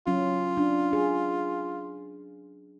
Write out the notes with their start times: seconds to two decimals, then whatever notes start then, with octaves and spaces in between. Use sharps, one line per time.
0.07 F#3 C#4 F4
0.57 D4
0.93 G#4